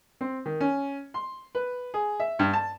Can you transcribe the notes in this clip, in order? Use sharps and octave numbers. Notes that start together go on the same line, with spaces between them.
C4
D#3
C#4
C6
B4
G#4
E5
G2
A5